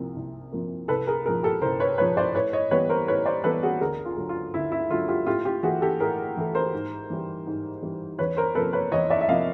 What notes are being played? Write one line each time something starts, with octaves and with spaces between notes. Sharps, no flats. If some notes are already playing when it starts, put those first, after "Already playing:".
Already playing: C2 C3 F3 A#3
C2
C3 F3 A#3
C2 A4 B4
G#4 A#4
A#2 F3 G#4 A#4
G4 A4
C2 A#4 C5
B4 C#5
A#2 F3 B4 C#5
C5 D5
A2 B4 C#5
C#5 D#5
E3 G3 B3 B4 C#5
A#4 C5
A2 B4 C#5
C5 D5
E3 G3 B3 A4 B4
F#4 G#4
D2 G#4 A#4
F4
D3 F#3
F4
D2 E4
E4
D3 F#3 F4
F4 G4
A2 F4 G4
F4 G4
E3 A3 F#4 G#4
G4 A4
A2 G#4 A#4
E3 A3
A#4 C5
G#2
E3 G3
G#2
E3 G3
E2 B4 C#5
A#4 C5
C3 F3 A#3 A4 B4
B4 C#5
E2 C#5 D#5
D5 E5
E5
C3 F3 A#3 D#5 F5